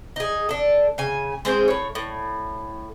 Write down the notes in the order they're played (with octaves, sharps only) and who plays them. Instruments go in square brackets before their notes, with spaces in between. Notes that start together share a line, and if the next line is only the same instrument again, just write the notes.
[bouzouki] D#4 G#4
D4 A4
C#3 G#5
G#3 C4 G#4 C5
A2 C#5
A2